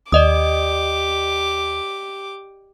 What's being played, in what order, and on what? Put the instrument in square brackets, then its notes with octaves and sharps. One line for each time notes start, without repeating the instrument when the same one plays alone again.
[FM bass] D#2 [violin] G4 D6 [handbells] D5 D#5 D#6